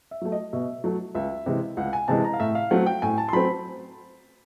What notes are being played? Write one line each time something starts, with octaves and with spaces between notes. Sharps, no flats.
E5
F#3 A3
D#5
B2 E5
F#3 A3
C#2 E5
C3 E3 G#3
C#2 F#5
G#5
C3 E3 G#3 A5
A#5
F5
A2 E5
F5
F#3 A3 C4 F#5
G5
A2 G#5
A5
C6
F#3 A3 C4 B5